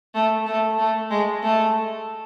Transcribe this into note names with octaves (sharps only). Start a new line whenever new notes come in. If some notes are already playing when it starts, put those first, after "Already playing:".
A3
A3
A3
G#3
A3